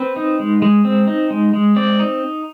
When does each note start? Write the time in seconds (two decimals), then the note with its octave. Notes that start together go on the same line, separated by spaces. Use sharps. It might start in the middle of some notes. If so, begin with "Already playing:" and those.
Already playing: C4 B4
0.16 D#4
0.40 G#3
0.62 G#3
0.85 C4
1.08 D#4
1.30 G#3
1.54 G#3
1.76 C4 D5
1.99 D#4